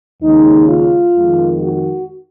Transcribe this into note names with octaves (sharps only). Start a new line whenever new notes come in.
D#2 C#3 G#3 D#4
F4
F2 D#3 G#3
F#4